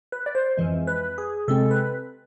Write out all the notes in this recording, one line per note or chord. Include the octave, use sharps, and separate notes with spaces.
B4
D5
C5
F2 E3 G#3
B4
G#4
C3 G#3 C4 A4
B4